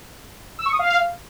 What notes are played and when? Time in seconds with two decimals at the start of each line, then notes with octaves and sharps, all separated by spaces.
0.59 E6
0.66 C#6
0.72 D#6
0.79 F5